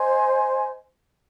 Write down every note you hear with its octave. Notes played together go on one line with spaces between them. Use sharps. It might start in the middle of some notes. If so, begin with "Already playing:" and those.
Already playing: C5 D#5 G#5 C6